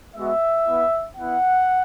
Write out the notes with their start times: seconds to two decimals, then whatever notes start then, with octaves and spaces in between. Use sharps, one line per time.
0.15 G#3 B3 F#4 E5
0.66 B3 E4
1.17 B3 E4 F#5